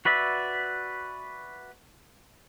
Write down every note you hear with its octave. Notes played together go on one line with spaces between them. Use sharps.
F#4 B4 D5 E5